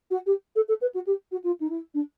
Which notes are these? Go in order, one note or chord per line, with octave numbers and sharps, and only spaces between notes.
F#4
G4
A4
A4
B4
F#4
G4
F#4
F4
D#4
E4
D4